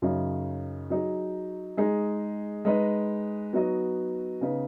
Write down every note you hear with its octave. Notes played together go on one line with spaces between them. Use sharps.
F#2 C#3 F#3 D#4
F#3 D#4 G#4
G#3 D#4 G#4
G#3 D#4 B4 D#5
F#3 B3 D#4 F#4 D#5
C#3 B3 D#4 B4